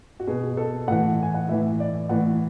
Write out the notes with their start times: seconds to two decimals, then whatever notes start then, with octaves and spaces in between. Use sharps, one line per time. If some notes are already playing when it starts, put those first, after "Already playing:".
0.20 F#4
0.28 B2 G#4
0.57 A4
0.88 A2 E3 F#5
1.23 G#5
1.34 F#5
1.49 A2 E3 E5
1.80 D5
2.09 A2 E3 F#5